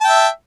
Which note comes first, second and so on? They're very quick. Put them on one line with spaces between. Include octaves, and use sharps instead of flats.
A5 G5 E5